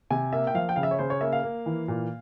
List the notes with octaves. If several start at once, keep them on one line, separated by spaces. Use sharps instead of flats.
C3 G#5
A#3 E5
G5
F3 F5
G5
C#3 F5
E5
C#5
C#3 C5
C#5
A#3 E5
F5
A#3
E3
A#2